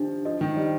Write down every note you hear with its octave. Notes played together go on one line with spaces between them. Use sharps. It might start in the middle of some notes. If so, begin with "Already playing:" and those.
Already playing: D#3 F3 D4 G4
F3 D#5
D#3
G3 D#5